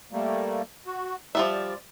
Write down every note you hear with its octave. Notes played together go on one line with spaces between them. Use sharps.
G3 A3 A#3
F#4
F3 G3 D5 E5